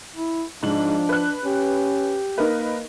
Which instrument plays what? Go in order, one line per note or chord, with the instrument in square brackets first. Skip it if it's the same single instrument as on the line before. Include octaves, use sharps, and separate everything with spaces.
[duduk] E4
[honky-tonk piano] G#2 F#7 [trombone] F3 [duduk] D4
[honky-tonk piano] B4 F#6
[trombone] C#4 [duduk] G4
[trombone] A#3 [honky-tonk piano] D#4 A#4 B4